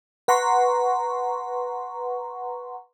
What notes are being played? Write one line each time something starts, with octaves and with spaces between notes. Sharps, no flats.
B4 F#5 A#5 C6 C#6